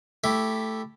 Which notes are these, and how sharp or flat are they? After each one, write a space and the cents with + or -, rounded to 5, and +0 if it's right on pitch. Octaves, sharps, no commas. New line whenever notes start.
A3 +0 E4 +0 G4 +0